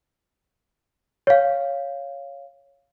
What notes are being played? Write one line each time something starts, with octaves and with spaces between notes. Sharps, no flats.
C#5 F5